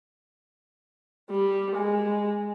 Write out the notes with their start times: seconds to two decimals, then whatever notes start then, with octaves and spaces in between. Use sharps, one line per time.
1.30 G3
1.76 G#3